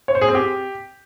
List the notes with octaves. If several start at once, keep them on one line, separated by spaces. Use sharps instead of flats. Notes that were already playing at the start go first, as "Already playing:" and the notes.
C#5
C5
G#4
C4
G4